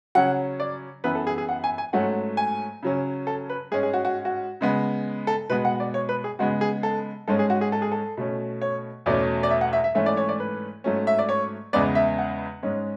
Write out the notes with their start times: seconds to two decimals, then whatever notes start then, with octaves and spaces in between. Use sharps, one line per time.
0.15 C#3 F#3 C#4 F#5
0.60 D5
1.04 F#2 E3 B3 B4
1.15 A4
1.27 G#4
1.38 G#4
1.49 F#5
1.64 G#5
1.78 G#5
1.93 G#2 F#3 A3 C#4 F#5
2.37 G#5
2.83 C#3 F#3 C#4
3.27 A4
3.50 B4
3.72 G#2 G#3 C#4 G#4
3.83 G#4
3.94 F#4
4.05 F#4
4.25 F#4
4.61 C#3 G#3 B3
5.27 A4
5.50 B2 G#3 B3 B4
5.65 F#5
5.80 D5
5.94 C#5
6.09 B4
6.24 G#4
6.39 C#3 G#3 B3 F#4
6.61 G#4
6.83 A4
7.28 G#2 G#3 C#4 A4
7.39 G#4
7.50 F#4
7.61 G#4
7.72 A4
7.82 G#4
7.92 A4
8.17 B2 A3 C#4
8.61 C#5
9.06 E2 B2 A3 C#4 D5
9.43 D5
9.50 E5
9.61 F#5
9.73 E5
9.84 E5
9.95 G#2 E3 A3 C#4 E5
10.06 D5
10.17 C#5
10.29 D5
10.40 B4
10.84 G#2 F#3 A3 C#4
11.07 E5
11.19 D5
11.29 C#5
11.73 E2 C#3 G#3 B3 D5
11.95 E5
12.18 F#5
12.63 G#2 G#3 C#4